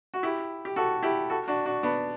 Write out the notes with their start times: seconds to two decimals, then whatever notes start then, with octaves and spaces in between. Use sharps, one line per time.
0.14 F#4
0.23 E4 G4
0.65 G4
0.76 F#4 A4
1.03 E4 G4
1.30 F#4 A4
1.48 D4 F#4
1.66 D4 F#4
1.83 B3 D4